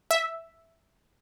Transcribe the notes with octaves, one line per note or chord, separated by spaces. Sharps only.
E5